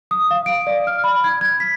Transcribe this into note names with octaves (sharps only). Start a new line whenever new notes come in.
D#6
F5
D7
D5
F6
B5
G#6
G#6
B6